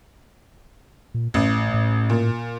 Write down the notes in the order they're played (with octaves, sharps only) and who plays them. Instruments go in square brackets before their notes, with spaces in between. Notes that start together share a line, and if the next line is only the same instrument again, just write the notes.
[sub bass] A#2
[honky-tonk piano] A1 [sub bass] A2
[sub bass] A2
[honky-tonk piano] A#2